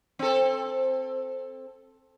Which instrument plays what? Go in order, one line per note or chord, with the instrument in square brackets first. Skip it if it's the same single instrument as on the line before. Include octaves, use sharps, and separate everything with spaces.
[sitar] C4 A4